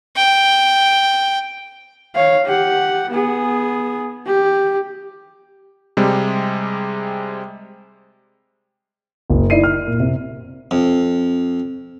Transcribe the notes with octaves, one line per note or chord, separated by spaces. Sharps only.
G5
C#5 F5
G4 F#5
B3 G#4
G4
C3 G3 G#3
F#1
D#4 E4 D5 C7 D#7
F6
A#2
C3
F2